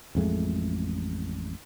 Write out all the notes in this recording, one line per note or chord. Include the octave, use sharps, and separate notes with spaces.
A1 F2 G#3 A3